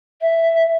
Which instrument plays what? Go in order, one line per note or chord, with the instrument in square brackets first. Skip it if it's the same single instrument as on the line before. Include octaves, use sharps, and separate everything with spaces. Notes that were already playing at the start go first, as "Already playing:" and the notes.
[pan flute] E5